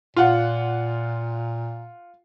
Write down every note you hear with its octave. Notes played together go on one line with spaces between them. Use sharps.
A#2 F4 F#5